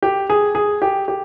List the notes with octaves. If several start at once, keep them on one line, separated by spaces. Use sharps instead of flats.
G4
G#4
G#4
G4
G4